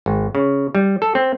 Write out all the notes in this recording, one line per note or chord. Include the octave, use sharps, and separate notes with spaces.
G#1
C#3
G3
A4
C4